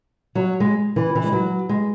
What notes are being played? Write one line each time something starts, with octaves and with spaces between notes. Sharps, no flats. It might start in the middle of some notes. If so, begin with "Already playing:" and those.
F#3
G#3
E3
E3
G#3
F#3
G#3